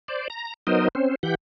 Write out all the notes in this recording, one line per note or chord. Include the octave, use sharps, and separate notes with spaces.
C5 D5
A#5
F#3 B3 D#4 A#4 C5 D#5
C4 C#4 C5
E3 G4 F#5 G6